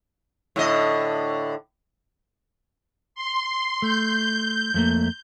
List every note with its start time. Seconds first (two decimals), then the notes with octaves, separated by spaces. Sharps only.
0.56 A2 D3 D#5
3.15 C6
3.82 A3 G6
4.74 F2 A3 A#3